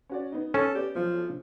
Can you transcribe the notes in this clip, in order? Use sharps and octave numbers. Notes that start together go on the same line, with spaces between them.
C#4 F#4 D5
B3 D#4
C#4 A4
B3 G4 D5
B1 F3